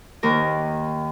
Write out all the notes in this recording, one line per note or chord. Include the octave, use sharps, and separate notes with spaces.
D#2 D#3 A#3 A#4 F6